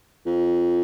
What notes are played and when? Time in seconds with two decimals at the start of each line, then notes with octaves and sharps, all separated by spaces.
0.26 F2